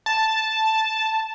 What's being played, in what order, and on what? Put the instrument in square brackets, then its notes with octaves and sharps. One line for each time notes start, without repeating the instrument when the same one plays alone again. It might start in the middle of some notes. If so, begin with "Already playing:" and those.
[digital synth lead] A5